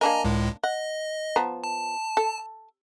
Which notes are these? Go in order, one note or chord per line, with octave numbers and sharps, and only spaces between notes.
A#3 D4 A#4 D#5 G#5 A#5
C#2 A2 G#3
D#5 F#5
F3 B3 A#5
A5
A4